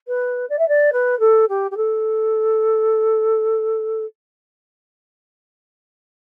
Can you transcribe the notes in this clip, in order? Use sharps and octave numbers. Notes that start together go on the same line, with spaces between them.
B4
D5
E5
D5
B4
A4
G4
G4
A4